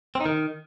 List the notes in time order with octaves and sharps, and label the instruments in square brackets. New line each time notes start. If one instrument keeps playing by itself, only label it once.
[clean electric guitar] C4
D#4
D#3